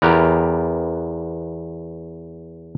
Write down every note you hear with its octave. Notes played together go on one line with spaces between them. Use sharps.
E2 B3 G4 A#4